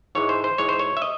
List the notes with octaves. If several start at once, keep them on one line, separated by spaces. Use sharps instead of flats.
G#2 E3 G#3 C#5
C5
C5
G#2 E3 G#3 C#5
C5
C#5
E5
D#5